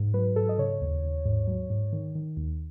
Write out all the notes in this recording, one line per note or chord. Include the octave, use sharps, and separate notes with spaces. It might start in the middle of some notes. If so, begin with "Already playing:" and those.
Already playing: G#2
F#3 B4
G#2 A4
D#5
C#3 C#5
D#2
D#2
G#2
F#3
G#2
D#3
D#3
D#2